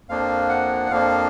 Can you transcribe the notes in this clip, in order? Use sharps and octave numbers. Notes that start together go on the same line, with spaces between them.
F2 F3 A#3 D4 F5
F#5
F2 F3 A#3 D4 F5